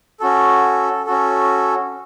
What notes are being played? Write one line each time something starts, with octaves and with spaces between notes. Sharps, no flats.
C#4 F#4 A4
C#4 F#4 A4